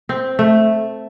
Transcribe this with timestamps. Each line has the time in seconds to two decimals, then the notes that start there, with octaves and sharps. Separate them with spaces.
0.09 C4
0.39 A3